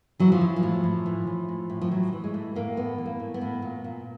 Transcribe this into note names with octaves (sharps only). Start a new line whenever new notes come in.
E3 F#3
F3
E3
F3
A2
A2
E3
E3
A2
A2
F3
E3 F#3
E3
G#3
A2 A3
A2 A#3
E3 B3
E3
A#3
A2
B3
A2
A#2
A#2